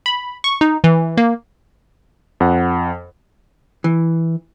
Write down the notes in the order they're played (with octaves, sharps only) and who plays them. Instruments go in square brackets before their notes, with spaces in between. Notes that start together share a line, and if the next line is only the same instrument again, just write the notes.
[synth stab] B5
C#6
D#4
E3
A#3
[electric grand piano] F2 F#5
[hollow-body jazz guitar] E3